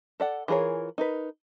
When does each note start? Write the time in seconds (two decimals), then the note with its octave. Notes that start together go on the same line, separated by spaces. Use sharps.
0.20 A4 D5 F#5
0.48 E3 F4 G#4 A#4 C#5
0.98 D#4 A#4 B4